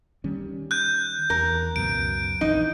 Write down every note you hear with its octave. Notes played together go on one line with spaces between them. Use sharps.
D#3 G3 C#4
F#6 G6
E2 A#4
C#2 F#2 B2 D7
A#1 E3 D#4